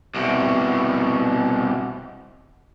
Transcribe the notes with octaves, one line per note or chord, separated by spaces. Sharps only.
C2 B2